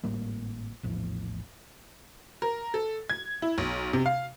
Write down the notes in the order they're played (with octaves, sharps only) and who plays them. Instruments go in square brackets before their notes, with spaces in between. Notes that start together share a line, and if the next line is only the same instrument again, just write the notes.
[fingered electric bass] G#1 A2 G3 A#3
A#1 E2 A2 F3
[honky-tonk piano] A#4
A4
G#6
E4
B1
C3
F5